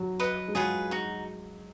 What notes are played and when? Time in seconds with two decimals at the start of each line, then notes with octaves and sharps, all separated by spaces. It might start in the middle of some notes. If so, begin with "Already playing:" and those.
Already playing: F#3
0.20 B4 D#5 F#5
0.48 G#3
0.55 F#3 F4 G#4 B4 F#5
0.91 D#4 F#4